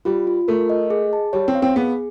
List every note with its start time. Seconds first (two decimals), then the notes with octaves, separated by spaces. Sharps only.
0.05 G3 F4
0.27 F4
0.48 A3 A#4
0.70 D#5
0.90 G#4
1.13 A5
1.33 G3 C#5
1.48 C4
1.55 F5
1.62 C4
1.76 B3 G#4